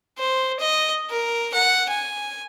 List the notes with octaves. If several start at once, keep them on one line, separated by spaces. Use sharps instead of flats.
C5
D#5
A#4
F#5
G#5